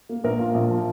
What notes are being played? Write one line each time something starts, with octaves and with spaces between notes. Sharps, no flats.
A#3
A#1 A#4
A#2
A#1
F3